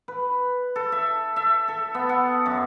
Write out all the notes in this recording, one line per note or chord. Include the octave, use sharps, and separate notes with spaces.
B4
A4
E5
E5
A4
B3
F#5
F#2